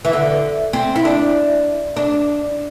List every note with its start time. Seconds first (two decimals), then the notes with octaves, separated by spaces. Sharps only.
0.05 E3
0.13 D3
0.73 C4
0.96 E4
1.05 D4
1.97 D4